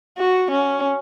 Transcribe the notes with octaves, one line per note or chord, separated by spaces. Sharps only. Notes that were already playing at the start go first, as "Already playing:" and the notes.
F#4
C#4